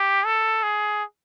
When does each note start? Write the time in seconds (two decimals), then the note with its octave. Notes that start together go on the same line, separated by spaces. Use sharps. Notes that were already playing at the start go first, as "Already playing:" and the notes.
Already playing: G4
0.25 A4
0.63 G#4